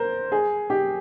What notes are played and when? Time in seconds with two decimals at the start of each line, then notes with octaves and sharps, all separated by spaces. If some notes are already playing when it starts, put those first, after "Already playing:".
Already playing: A#4 C5
0.32 G#4
0.70 G4